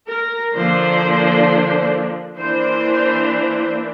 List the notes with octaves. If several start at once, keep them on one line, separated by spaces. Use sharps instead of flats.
A#4
D3 F3 A#3 D4 C5
E3 A#3 D4 C5